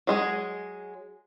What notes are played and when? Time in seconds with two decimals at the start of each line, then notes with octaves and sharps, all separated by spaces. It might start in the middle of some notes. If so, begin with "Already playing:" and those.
0.07 F#3 G#3 G#4